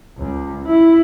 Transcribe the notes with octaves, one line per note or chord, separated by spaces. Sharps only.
C#2
E4